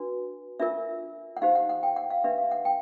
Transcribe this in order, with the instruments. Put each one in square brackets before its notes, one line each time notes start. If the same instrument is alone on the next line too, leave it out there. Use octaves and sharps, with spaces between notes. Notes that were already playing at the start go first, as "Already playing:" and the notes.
Already playing: [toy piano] D4 F#4 B4
D4 F4 A#4 E5
F#5
D#4 G4 C5 F5
F#5
F#5
G5
F#5
F5
D4 G4 B4 E5
F5
F#5
G5